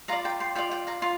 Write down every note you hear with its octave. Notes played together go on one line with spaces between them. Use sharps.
F4 D5 F5 A#5
G5 C6
G5 C6
F4 D5 G5
G5
F5 A#5
F4